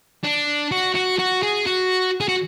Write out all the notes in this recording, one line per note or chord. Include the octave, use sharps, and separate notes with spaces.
D4
F#4
F#4
F#4
G#4
F#4
G#4
F#4